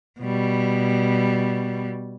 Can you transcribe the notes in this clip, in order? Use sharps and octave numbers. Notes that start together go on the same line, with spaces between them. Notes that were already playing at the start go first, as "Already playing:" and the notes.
B2 G3